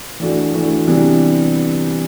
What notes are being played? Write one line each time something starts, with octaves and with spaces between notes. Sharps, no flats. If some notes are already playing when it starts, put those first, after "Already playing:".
E3 A3 D4 F#4
E3 A3 D4 F#4
C3 E3 G3 B3 D4